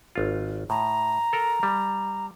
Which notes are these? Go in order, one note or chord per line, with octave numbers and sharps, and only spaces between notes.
G#1 F4
A2 A#5
A4 A#4
G3